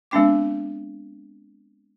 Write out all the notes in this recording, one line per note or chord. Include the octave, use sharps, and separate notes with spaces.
G#3 B3 C4 D4 G5 D6